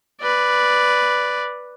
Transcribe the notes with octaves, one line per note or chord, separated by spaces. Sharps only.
B4 D5